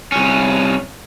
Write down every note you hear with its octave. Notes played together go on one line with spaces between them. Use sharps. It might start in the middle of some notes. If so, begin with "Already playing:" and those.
C2 C#4